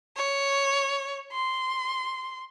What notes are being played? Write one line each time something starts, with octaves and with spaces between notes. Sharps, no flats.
C#5
C6